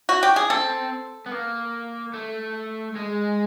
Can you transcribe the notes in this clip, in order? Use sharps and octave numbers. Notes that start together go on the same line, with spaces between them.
F#4
G4
G#4
C4 A4
B3
A#3
A3
G#3